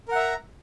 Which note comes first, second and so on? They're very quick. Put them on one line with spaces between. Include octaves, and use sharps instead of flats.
A#4 F#5 E5 A#5